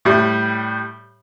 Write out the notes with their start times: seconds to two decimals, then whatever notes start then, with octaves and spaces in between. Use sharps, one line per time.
0.05 A2 G3